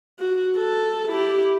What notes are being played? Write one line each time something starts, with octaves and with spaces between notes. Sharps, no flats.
F#4
A4
E4 G4